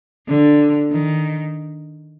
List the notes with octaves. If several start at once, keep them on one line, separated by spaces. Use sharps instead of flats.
D3
D#3